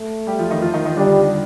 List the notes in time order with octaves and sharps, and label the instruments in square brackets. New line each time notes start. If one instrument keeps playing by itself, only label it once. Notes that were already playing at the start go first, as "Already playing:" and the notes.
Already playing: [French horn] A3
[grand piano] G3 G4
F3 F4
D#3 D#4
F3 F4
D#3 D#4
D#3 D#4
[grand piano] D3 D4 [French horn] G3